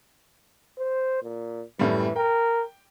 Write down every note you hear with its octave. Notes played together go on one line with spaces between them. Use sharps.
C5
A#2
F#2 A2 E3 G3
A#4 G5